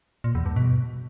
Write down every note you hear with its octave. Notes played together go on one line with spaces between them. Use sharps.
A#2
E2
G2
B2